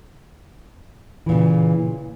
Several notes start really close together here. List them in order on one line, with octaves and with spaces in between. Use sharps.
E3 A#2 C#3